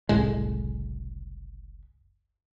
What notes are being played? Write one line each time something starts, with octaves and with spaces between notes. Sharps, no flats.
F#1 C2 A2 G#3